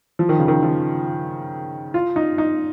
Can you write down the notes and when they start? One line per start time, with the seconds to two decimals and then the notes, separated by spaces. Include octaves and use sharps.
0.19 F3
0.29 D#3
0.39 C#3
0.48 D#3
0.63 F3
1.94 F4
2.16 D#4
2.38 D#4